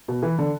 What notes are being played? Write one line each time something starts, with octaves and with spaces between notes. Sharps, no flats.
B2
E3
D3